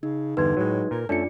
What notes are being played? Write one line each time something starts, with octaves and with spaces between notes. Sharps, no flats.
C#3 D#4
E2 G2 D3 D#4 B4 C6 G#6
A2 F#3 G#3
A#2 A#4
F#2 A3 C#4 D4 F4 A4 D5 C#7